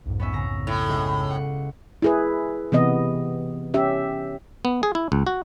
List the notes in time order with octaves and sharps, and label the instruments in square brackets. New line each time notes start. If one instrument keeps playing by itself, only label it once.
[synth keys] B1 F2 G#2
[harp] B3 C#4 E5
C#3 A#5
[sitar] A2
[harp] C#2
F#5
[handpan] E4 G#4 B4
C3 E3 B3 D#5
C#4 G4 E5
[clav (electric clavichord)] B3
G#4
E4
C#2
F#4